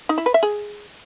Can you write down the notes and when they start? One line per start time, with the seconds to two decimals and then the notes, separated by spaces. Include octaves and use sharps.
0.09 D#4
0.18 E4
0.26 B4
0.34 E5
0.43 G#4